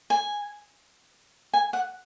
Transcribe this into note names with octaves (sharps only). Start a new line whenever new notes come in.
G#5
G#5
F#5